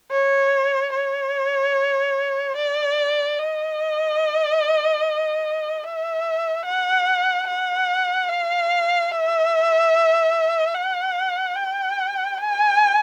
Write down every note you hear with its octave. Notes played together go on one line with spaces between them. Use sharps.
C#5
C#5
D5
D#5
E5
F#5
F#5
F5
E5
F#5
G5
G#5